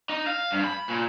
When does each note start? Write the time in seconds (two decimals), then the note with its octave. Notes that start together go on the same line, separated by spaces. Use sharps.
0.09 D#4
0.27 F5
0.52 G2
0.64 B5
0.88 A#2